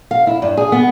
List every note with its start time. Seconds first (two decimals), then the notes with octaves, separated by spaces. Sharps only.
0.11 F5
0.27 E4
0.42 G2
0.57 G#4
0.72 B3